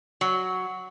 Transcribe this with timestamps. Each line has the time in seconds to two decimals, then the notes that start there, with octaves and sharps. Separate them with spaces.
0.21 F#3